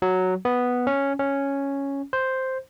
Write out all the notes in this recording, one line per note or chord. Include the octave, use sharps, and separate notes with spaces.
F#3
B3
C#4
C#4
C5